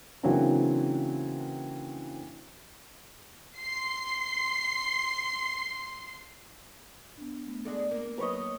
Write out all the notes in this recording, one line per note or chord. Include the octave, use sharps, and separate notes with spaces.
C#3 E3 F#3 A#3 C4 D4
C6 C7
B3 D4
A3 B3
G#3 D4 A4
A#3 A#4
F#3 B4 C#5 D#5